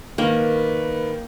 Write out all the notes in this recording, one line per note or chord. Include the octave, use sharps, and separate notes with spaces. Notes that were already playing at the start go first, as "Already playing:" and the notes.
D#3 A#3 B4